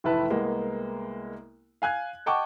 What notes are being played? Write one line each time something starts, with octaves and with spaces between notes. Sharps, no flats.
F1 A2 E3 E4 B4 A5
C2 G#3 A#3 B3
F5 G#5 F#6 G#6
D#5 F#5 G5 A5 C#6 D6